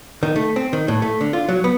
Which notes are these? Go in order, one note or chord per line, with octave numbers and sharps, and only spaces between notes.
D#3
A3
C4
D#3
A2
A3
D3
F4
F#3
B3